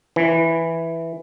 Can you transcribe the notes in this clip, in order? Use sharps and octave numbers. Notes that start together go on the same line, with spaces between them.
E3